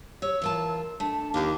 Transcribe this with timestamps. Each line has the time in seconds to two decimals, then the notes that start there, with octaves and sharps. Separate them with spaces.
0.22 G4 C#5 E6
0.42 E3 F4 A#4 A5
1.00 A3 D4 A5
1.34 D#2 F4 G4 A#4 D6